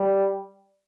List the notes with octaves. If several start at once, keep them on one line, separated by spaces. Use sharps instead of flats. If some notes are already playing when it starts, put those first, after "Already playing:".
Already playing: G3